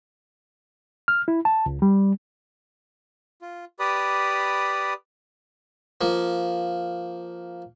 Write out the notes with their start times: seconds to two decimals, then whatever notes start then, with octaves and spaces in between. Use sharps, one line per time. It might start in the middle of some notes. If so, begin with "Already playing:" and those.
1.08 F6
1.28 E4
1.45 A5
1.66 C#2
1.82 G3
3.42 F4
3.79 G4 B4 D5 B5 D#6
6.01 F3 A#3